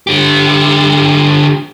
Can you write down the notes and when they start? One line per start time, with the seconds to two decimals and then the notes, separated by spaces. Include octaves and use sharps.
0.07 D3 G4